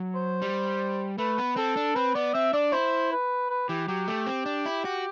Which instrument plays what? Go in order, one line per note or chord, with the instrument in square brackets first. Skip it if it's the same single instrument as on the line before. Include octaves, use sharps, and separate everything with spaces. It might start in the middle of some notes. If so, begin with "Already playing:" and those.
Already playing: [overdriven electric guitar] F#3
[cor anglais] C5
[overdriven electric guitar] G3
[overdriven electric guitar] A3 [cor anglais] B4
[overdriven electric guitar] B3
[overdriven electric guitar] C4 [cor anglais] A4
[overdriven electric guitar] D4
[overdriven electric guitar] C4 [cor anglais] B4
[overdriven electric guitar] B3 [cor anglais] D5
[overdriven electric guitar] C4 [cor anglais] E5
[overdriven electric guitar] D4 [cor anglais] D5
[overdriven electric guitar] E4 [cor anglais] C5
[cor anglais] B4
B4
[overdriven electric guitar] E3 [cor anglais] G4
[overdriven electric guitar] F#3 [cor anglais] G4
[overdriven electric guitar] A3 [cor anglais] G4
[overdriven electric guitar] C4
D4
E4
F#4